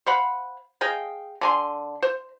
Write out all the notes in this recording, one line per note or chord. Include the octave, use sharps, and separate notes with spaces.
C5 F5 F#5 B5
G#4 D#5 F5 G5
D3 G#5 C6
C5